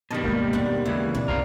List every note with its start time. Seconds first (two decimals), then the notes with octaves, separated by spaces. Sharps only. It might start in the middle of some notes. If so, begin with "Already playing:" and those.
0.11 G2 B2 D#3 G3 D#5 A5
0.24 G#3 A#3 D#4 G4 A#4
0.53 D#2 C4 D4 F#5
0.85 C#2 C#3 E3 E4
1.14 B2 C4 D4
1.28 C2 F#2 C4 F4 A#4